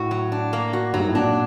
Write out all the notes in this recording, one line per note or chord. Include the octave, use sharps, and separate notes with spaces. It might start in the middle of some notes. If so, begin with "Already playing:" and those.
Already playing: A2 F#4
F#3
D4
A#3
F#4
G2 F#3
G#2
A2
A#2 D4